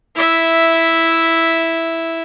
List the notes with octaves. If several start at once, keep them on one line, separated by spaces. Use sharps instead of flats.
E4 E5